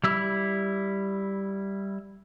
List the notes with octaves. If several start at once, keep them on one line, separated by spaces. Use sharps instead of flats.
G3 E4 E6